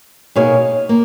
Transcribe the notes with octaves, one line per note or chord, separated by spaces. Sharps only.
B2 A#3 D#4 G#4 C#5
A#3